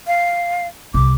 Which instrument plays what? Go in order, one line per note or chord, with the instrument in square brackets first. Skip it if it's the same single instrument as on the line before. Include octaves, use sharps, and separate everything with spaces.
[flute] F5
[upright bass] C2 [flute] D6